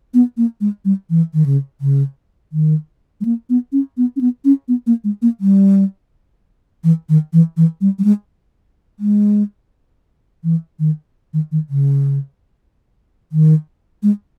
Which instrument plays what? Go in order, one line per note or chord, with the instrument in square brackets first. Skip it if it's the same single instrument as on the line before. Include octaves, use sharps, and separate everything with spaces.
[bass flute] B3
A#3
G#3
G3
E3
D#3
C#3
C#3
D#3
G#3
A#3
B3
C#4
B3
C#4
B3
C#4
B3
A#3
G#3
A#3
G3
E3
D#3
E3
E3
G3
G3
G#3
G#3
E3
D#3
D#3
D#3
C#3
D#3
G#3